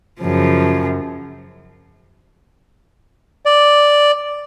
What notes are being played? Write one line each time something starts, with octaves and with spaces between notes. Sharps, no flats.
F#2 C#3 F3
D5